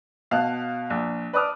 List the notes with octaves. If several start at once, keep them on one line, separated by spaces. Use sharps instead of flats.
B2 F5 A5 F#6
A#1
B4 D5 A5 D6 D#6 F6